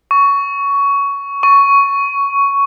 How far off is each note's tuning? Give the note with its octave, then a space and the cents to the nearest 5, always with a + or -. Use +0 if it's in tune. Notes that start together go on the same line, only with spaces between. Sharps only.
C#6 +15
C#6 +10